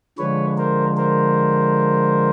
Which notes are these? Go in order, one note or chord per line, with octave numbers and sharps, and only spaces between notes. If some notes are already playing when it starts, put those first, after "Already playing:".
D3 F3 G#3 B4 C#5
A#4 C5
A#4 C5